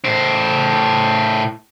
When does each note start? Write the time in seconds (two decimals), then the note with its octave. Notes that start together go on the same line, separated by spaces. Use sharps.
0.05 A2 C5